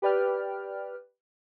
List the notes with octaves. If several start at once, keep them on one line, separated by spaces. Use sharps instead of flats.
G4 B4 D5 G5 F6